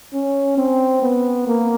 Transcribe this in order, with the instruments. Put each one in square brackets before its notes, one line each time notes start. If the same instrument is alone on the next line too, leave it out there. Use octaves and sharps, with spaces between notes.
[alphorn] C#4
C4
B3
A#3